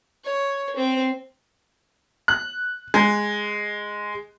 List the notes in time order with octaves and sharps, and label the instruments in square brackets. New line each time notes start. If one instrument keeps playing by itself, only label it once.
[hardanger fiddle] C#5
C4
[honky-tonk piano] F#6
G#3